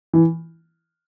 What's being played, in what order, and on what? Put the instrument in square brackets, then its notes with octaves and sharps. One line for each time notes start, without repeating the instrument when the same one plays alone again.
[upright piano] E3